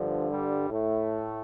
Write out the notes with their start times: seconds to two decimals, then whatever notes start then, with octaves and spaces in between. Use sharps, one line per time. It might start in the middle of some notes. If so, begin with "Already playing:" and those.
Already playing: G2 D3 F3
0.28 G3
0.69 A2 A3